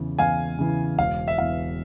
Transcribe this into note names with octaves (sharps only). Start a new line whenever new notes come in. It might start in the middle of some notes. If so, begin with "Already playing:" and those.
Already playing: E2 C#3 E3
E2 F5 G#5
C#3 E3
E1 F5
E5
E2 E3 F5